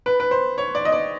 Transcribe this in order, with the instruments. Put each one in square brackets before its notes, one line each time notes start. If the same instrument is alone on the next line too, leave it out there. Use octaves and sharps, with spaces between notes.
[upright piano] B4
B4
C5
C#5
D5
D#5
D5